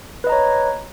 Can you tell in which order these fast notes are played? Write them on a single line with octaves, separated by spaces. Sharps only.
B4 D#5 A#5 C#5